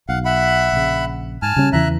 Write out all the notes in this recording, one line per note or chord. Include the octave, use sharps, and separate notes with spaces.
B1 F5 F#5
E5 F#5 B5
A#1 C#3
G#2 G#5 A5 F6
C#3 G3 C#4
E2 C#3 E3 E5 A#5 F#6